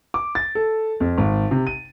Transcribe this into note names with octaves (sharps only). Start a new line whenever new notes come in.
D6
A6
A4
F2
G#1
C3
D#7